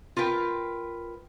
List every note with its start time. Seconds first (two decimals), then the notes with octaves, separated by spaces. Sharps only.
0.17 F4 A#4 B4 G5